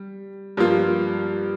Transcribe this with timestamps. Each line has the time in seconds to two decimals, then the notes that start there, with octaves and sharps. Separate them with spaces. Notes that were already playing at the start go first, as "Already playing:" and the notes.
Already playing: G3
0.57 G2 F3 A#3 F4